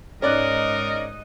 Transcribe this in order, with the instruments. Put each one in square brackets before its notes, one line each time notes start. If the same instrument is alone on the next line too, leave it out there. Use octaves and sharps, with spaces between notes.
[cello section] G#2 D#4 D#5 [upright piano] C#4 D5 F#6 [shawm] A#4